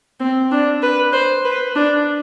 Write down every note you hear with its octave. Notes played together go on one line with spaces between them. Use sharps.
C4
D4
B4
C5
B4
D4